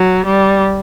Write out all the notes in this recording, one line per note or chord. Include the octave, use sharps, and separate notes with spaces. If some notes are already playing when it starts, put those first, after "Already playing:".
Already playing: F#3
G3